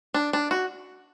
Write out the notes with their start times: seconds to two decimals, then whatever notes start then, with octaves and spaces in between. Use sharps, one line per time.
0.14 D4
0.33 D4
0.51 F#4